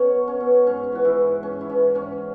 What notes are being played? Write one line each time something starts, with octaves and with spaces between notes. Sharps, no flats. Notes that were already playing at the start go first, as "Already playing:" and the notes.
Already playing: B2 C#4 C#5
F#3
C#4
B2
G#2 C#4
E3 F#4
E3 E4
G#2
G#2 C#4
E4
E3 C#4
G#2 C#4